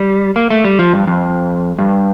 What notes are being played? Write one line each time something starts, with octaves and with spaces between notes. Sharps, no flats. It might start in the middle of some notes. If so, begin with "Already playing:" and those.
Already playing: G3
A#3
A3
G3
F3
G2
F2
G2